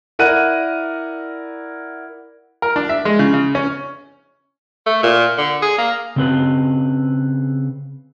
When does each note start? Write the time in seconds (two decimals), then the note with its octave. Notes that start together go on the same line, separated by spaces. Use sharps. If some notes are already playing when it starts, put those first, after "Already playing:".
0.19 E4 A#4 D5 F#5 F#6 D#7
2.62 A#4
2.76 D4
2.89 E5
3.05 G#3
3.19 C#3
3.34 C#3
3.55 C#4
4.87 A3
5.03 A#2
5.38 D3
5.62 G#4
5.78 A#3
6.16 C#3 C4 B4